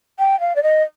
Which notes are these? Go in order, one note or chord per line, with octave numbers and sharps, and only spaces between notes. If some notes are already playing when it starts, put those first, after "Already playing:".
G5
F5
D5
D#5